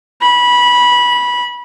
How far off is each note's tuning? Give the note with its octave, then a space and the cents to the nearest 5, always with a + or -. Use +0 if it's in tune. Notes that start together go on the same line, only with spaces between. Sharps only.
B5 -20